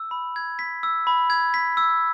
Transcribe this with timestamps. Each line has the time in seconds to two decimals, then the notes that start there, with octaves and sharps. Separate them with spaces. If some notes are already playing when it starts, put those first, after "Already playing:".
Already playing: E6
0.11 B5
0.36 G#6
0.59 B6
0.83 E6
1.07 B5
1.30 G#6
1.54 B6
1.77 E6